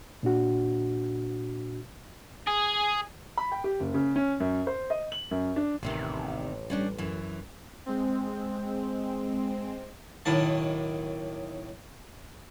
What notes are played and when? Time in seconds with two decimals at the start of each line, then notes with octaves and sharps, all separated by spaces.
0.23 A#2 D4 F#4
2.47 G#4
3.37 B5
3.52 G5
3.64 G4
3.80 F#1
3.94 C#3
4.16 C#4
4.40 F#2
4.67 C5
4.90 D#5
5.12 F#7
5.31 F#2
5.56 D4
5.83 A1 E2 C3 D#3
6.70 G3 C#4 D4
6.98 F#2 E3
7.86 G#3 C4
10.26 B1 A2 D#3 A5